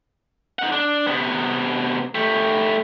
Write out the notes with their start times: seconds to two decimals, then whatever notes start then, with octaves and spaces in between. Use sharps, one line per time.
0.59 D#4 F#5
0.72 D4
1.07 C3 B3
2.15 A3 G4